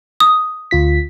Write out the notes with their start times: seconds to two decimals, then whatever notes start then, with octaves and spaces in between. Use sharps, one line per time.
0.20 D#6
0.71 D2 F4 B6